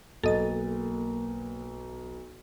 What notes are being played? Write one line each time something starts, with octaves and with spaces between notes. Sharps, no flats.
B1 A#3 A4 D#5 A6